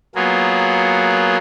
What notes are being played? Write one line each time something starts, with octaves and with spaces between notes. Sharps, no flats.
F#3 A#3 B3 F4 G#4